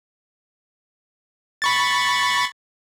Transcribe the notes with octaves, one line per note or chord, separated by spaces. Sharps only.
B5 C#6 A6